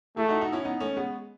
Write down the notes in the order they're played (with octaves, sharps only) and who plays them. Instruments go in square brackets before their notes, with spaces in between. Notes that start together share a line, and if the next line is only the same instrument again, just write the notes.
[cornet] A3 [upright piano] E4 G#4
[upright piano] D#4 F#4
D#4 F#4
C#4 E4
B3 D#4
A3 C#4
G#3 B3